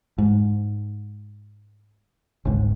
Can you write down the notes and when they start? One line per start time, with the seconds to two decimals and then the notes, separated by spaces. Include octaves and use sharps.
0.18 G#2
2.45 G1 C#2 G#2